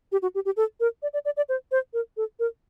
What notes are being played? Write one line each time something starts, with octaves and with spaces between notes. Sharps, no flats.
G4
F#4
G4
G4
A4
A#4
D5
D5
D5
D5
C5
C5
A#4
A4
A#4